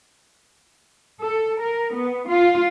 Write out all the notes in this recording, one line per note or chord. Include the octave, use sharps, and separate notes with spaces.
A4
A#4
B3
F4